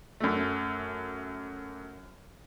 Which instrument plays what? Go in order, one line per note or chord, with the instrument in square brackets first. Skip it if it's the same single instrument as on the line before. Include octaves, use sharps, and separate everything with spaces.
[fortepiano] F#2 A3